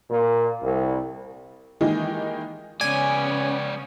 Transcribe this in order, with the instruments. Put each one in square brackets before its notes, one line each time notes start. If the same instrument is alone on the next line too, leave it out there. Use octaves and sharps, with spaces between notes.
[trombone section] A#2
C2
[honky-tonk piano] D#3 E3 G#3 A#3 D#4 G4
[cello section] C#3 B3 C#4 [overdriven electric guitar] G#3 D5 [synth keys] G#5